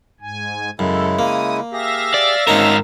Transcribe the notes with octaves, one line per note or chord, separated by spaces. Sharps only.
G#2 G#5
F#2 C#3 G#3 E4 A4
A#3 D#6
G4 G#4 E5 F5 A#6
D5
G#2 A#3 C#4 D#4 A#4 C5 F#5 A5